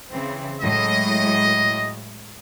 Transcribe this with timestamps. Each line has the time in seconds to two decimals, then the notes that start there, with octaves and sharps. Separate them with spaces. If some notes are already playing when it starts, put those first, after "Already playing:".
0.11 C#3 E3 C4
0.62 A2 F#3 G#3 D#5